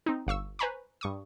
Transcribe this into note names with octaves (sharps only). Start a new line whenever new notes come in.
C4 D#4
G1 F5 C#6 E6
B4 C5 G#5 A#5 B5 C#6
G2 C#6 D#6